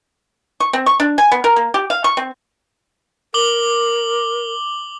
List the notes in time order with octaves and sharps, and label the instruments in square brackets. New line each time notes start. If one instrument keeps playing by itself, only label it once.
[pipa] C#6
C4
C#6
D4
G#5
B3
A#4
A#3
G4
F5
C#6
C4
[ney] A#4 [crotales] D6 F#7 G7